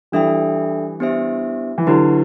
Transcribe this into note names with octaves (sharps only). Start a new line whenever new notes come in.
E3 G3 D4 A4 E5 G5
B3 D4 G4 C5 E5
E3
D3 F#3 E4 G4 B4